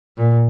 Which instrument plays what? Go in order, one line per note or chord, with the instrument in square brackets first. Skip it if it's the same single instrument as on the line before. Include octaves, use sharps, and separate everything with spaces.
[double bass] A#2